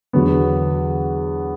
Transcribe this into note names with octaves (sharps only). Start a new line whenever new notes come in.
E2 D3 F#3 B3